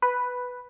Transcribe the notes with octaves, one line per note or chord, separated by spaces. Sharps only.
B4